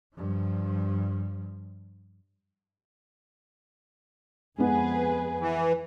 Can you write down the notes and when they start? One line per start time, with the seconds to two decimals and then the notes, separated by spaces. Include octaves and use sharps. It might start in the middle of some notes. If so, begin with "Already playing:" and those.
0.15 G2 F3
4.58 F2 G#3 B3 G#4 B4
5.40 E3